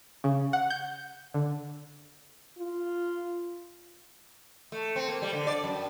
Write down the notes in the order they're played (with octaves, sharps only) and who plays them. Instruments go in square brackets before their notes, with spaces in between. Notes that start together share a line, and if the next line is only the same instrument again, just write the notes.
[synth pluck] C#3
F#5
G6
D3
[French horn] F4
[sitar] A3
C4
A#3
G3
D3
D5
F#2